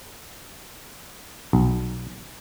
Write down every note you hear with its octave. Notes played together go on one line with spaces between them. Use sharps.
B1